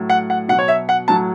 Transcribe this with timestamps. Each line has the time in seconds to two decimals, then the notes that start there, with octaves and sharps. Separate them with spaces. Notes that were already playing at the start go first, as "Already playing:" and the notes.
Already playing: A2 F#3
0.09 F#5
0.30 F#5
0.48 B2 F#5
0.52 F#3
0.59 C#5
0.68 E5
0.89 F#5
1.08 A2 F#3 A5